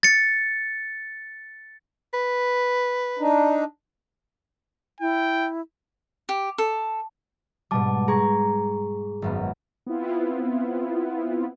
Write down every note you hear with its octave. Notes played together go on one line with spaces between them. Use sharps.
A6 C#7
B4
D4 D#4
E4 G5
G4
A4
G#2 B2 G3 A5 D6
G#4 A#5 C#6 G#6
G#1 F#2 B3
B3 C4 E4 F4